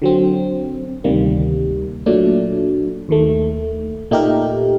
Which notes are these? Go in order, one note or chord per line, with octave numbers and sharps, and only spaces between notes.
D3 F#3 C4
D2 C3 D#3 G3 A#3
A#2 F#3 A3 D4
D#2 D#3 A3
A#2 A3 D#4 G4 A#4